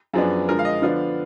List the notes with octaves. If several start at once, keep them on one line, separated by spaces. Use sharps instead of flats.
F#2 F3 B3 D4 G#4
D3 F3 G#3 A#4
F5
D#5
D3 F3 B3 D4 F5